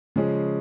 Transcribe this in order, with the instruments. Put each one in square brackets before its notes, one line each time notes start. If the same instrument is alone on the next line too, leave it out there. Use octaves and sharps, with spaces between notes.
[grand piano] C#3 F3 G#3 C#4